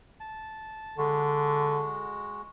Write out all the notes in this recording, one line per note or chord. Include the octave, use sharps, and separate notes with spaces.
A5
D3 G#3 F#4